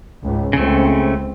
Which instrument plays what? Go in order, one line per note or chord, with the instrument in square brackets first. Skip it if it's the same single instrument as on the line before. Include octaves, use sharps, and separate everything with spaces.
[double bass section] C#2 G#2
[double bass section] C#2 C4 [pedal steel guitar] C#3 A3